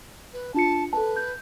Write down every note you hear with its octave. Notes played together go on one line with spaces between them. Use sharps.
B4
D4 F4 A5 C#7
A4 B4 A5
G6